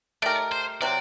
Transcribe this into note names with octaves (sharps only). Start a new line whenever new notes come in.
A3 D#4 G4 A#4 D5
C5
C3 F#3 C4 D5